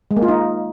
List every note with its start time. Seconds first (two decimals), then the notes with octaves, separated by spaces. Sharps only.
0.11 G#3
0.17 A#3
0.22 F4
0.28 D#4